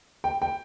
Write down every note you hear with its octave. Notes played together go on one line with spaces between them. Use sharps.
G5
G5